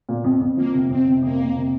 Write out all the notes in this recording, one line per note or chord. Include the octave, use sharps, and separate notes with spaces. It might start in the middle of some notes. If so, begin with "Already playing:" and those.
A#2
F2
F2
F3 A#3
C3
F2 C4
C3
F2 A#3
F2
C3